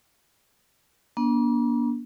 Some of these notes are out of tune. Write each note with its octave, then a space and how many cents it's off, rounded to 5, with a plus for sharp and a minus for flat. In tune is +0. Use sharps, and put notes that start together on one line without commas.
A#3 +45 D4 -20